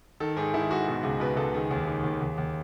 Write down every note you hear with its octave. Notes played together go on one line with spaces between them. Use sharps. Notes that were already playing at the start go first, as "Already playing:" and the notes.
D#3 A4
G#2 G#4
D#3 E4
G#2 F#4
B2 F#4
C#2 G#4
B2 B4
C#2 A4
D#3 G#4
D#2
D#3
D#2
D#2
D#2